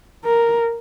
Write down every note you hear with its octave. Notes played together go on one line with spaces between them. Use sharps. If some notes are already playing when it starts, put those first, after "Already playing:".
A#4